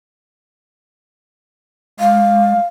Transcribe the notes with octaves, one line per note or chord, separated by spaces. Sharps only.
G#3 F5